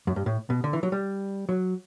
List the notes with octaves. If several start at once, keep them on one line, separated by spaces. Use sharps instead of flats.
F#2
G2
A2
B2
D3
E3
F#3
G3
F#3